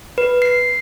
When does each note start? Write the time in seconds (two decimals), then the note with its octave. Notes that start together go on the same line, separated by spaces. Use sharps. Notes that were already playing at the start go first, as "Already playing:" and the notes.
0.18 B4
0.42 C7